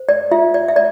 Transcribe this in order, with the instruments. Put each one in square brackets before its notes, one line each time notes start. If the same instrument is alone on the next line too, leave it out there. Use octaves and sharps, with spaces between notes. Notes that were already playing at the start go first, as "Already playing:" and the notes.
Already playing: [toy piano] C5
D5
F4 E5
D5
E5
D5